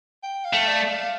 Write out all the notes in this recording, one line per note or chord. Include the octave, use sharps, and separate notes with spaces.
G5
F5
A3
D5
F5